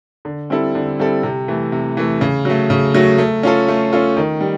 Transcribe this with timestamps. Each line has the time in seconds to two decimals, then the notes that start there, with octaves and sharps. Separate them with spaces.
0.25 D3
0.50 G3 C4 E4 A4
0.75 D3
0.99 G3 C4 E4 A4
1.23 C3
1.48 E3 A3
1.72 C3
1.97 E3 A3
2.21 C#3
2.45 F#3 A3
2.70 C#3
2.94 F#3 A3
3.18 A3
3.43 C#4 F4 A4
3.68 A3
3.93 C#4 F4 A4
4.17 D#3
4.41 G3